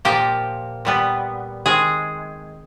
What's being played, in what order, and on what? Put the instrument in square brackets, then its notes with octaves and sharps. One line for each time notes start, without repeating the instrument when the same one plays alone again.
[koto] A#2 F3 A#3 G4
A#2 G3 B3
D#3 G#3 C4 G#4